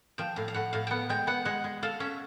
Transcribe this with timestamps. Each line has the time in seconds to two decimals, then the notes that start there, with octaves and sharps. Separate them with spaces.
0.18 F3 G5
0.36 A2 F5
0.48 F5
0.54 A2 F#5
0.73 A2 F5
0.87 G5
0.91 B3 F#5
1.09 G#3 G5
1.27 B3 F#5
1.45 G#3 F#5
1.64 G#3
1.83 A4 F5
2.00 C#4 E5